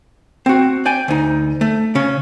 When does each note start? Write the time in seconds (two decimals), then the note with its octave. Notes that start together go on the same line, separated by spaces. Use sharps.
0.46 C4 F#4
0.86 D5 G5 G#5
1.08 D2 D#4
1.61 A3
1.95 C#3 C#4